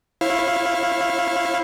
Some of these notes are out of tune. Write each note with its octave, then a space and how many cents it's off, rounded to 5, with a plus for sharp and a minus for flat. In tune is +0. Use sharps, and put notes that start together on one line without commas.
E4 +0 C#5 -35 F5 +0